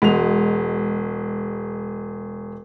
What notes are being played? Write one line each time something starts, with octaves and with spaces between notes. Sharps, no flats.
E1 G#3 F#4 F7